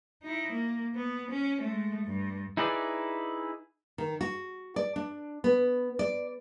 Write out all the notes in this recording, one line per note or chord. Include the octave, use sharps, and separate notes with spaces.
D#4 E4
A#3
B3
C#4
G#3 A3
G2
D#4 E4 G#4 B4 D5
D#3
F#4
D5
D4
B3
D5